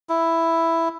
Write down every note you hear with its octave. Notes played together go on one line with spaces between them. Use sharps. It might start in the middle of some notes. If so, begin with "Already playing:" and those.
E4